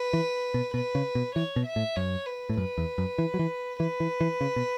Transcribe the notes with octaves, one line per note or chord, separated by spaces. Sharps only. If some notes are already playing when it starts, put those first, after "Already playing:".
Already playing: B4
E3
B2
B2 B4
C#3
B2
E3 C#5
B2
E5
A2
F#2 C#5
B4
A2
F#2 B4
E2
F#2
E3
F#3
E3
E3 B4
E3
E3
C#3
B2